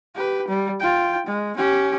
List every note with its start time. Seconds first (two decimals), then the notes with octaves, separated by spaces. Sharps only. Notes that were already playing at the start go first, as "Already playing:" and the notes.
0.15 G4 B4
0.48 G3
0.80 F4 G5
1.26 G#3
1.56 C#4 G4